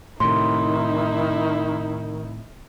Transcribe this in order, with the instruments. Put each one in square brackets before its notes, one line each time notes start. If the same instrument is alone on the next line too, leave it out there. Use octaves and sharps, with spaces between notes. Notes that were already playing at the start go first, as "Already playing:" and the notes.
[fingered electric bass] A2 C3 [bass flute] D#3 [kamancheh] D#4 E4 [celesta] C6